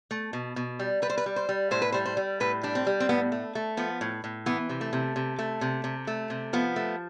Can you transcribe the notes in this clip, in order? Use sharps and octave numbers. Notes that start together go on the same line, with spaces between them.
A3
B2
B2
G3
G3 B4
C5
B4
G3
C5
G3
A2 C5
B4
G3 C5
C5
G3
A2 B4
G3 D4
C4
G3
C4
A2 B3
A3
A3
F3 B3
A2
A2
E3 B3
C3
A3
C3
C3
A3
C3
C3
A3
C3
F3 B3
A3